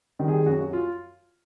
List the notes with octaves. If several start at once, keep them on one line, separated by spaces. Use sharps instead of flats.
D#3 G3 C4
G#4
F#2 F#4
F#4
F4